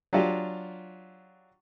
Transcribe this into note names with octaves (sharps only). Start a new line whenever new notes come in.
F#3 D4 F4 G4